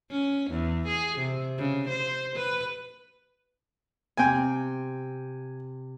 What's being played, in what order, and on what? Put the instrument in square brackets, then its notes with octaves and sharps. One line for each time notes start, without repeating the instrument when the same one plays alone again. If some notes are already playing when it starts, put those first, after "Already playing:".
[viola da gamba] C#4
E2
G#4
C3
C#3
C5
B4
[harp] C3 C4 [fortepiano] G5 G#5